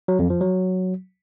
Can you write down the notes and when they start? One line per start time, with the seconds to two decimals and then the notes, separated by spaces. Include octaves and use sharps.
0.08 F#3
0.19 F2
0.30 F3
0.41 F#3